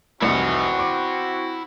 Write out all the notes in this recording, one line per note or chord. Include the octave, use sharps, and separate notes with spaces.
F1 C2 C4 E4 F#4 F#5
D6